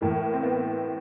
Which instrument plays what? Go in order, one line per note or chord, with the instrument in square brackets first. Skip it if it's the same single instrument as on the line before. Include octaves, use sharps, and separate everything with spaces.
[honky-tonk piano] A2 E3 A#3
C4
B3